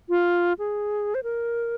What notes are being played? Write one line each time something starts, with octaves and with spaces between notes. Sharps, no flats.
F4
G#4
C5
A#4